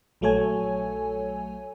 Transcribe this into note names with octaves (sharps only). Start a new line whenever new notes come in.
A#1 F#3 A3 A4 C#5 G#5